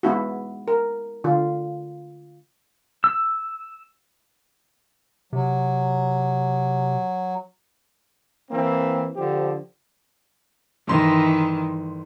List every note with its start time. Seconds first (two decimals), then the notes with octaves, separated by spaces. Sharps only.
0.03 G#3 B3 E4 F#4
0.68 A#4
1.24 D3 F4
3.04 E6
5.33 C3 F#3
8.51 E3 A#3 C4
9.16 D3 F3 G4 C5
10.88 G1 D#3 E3 C6